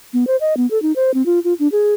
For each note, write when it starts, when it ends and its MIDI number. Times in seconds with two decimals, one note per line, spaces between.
0.13 0.27 59
0.27 0.36 72
0.41 0.56 75
0.57 0.69 59
0.71 0.80 69
0.82 0.92 63
0.96 1.13 72
1.14 1.25 60
1.26 1.39 65
1.44 1.54 65
1.59 1.68 62
1.72 1.94 68